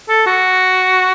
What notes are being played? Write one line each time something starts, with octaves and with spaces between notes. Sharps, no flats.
A4
F#4